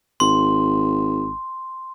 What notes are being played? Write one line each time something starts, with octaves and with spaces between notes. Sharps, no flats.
G#1 C6